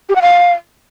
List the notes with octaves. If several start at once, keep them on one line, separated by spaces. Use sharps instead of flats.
G4
F#5
F5